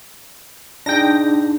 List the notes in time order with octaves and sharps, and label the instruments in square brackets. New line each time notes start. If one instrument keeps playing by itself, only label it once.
[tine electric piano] D4 D#4 G#4 [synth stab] G5 A#6